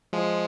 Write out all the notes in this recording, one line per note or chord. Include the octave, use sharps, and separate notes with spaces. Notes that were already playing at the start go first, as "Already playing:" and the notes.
F3 G#3